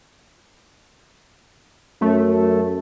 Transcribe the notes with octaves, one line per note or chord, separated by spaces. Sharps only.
F#2 A3